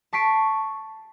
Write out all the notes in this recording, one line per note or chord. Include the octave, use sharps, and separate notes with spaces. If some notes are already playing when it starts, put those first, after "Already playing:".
A5 C#6 B6 C7 D7